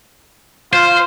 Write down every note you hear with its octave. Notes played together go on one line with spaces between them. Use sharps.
F4 C5